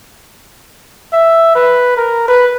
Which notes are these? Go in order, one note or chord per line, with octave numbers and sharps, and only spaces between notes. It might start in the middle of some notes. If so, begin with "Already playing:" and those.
E5
B4
A#4
B4